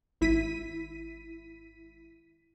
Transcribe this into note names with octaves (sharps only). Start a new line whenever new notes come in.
G#1 E4 B6 D#7